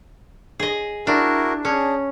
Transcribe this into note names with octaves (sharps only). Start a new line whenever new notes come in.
G#4 D#5
D4 E4 F#4 A#4
C#4 D4 G#4